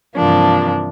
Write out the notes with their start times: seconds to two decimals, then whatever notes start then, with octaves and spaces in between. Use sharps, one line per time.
0.16 G2 C3 E3 F3 A#3 D4